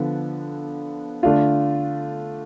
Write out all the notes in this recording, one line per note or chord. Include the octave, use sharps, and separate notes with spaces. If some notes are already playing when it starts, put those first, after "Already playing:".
Already playing: D3 F3 B3
D3 A3 D4 F4